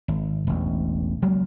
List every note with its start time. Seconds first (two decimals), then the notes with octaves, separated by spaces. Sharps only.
0.08 G#1
0.47 E1 A1
1.22 C#2 F#3 G#3 A#3